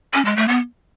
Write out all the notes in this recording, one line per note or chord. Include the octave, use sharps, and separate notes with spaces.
C#4
G#3
A3
B3